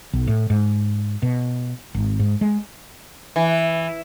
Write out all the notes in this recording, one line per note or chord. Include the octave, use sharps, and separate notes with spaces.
B1
A2
G#2
B2
G#1
G#2
G#3
E3